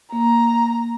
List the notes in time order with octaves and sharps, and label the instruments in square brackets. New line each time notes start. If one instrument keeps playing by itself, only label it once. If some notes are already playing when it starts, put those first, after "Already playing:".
[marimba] A#3 [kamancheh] A#5